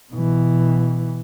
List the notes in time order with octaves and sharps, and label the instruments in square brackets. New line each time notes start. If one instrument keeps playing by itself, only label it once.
[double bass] B2 E3